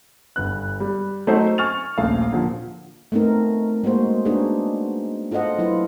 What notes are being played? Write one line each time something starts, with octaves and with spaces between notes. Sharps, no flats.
G1 B3 F#6
G3
F#3 A3 D#4 A4 C5
G#5 C#6 F6 A6 F7
D#1 A#1 A3 F5
A#2 D3 F3
A3 B3 C4 D#4 A#4
G#3 A#3 F#4 C5
B3 D4 D#4 F#4 G#4 C5
F4 A4 C5 D#5 F#5
F#3 E4 F4 B4